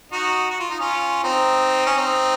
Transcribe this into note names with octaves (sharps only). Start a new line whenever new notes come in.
D#4 F#4
F#4
F4
D#4
C#4 F4
C4 D#4
C#4
C4 D#4